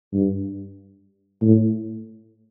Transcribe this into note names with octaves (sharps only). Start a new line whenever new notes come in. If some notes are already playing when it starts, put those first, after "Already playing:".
G2
A2